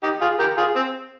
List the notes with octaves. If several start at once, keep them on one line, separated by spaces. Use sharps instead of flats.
D#4 G4
F4 G#4
G4 A#4
F4 G#4
C4